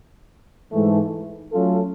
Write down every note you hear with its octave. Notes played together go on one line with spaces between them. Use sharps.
G#2 E3 A3
F#3 A3 C#4 F4 A4